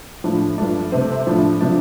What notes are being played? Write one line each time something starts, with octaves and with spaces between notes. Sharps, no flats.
A2 F3 D4
G2 F3 A3 D4
C3 A3 C4
A2 F3 D4
C3 F3 D4